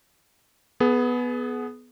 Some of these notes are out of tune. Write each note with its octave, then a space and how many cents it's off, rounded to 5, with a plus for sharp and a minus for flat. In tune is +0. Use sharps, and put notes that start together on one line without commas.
B3 +0 G#4 +30